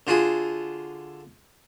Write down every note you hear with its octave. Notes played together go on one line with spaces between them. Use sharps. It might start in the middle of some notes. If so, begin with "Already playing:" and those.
D3 F4 F#4 G#4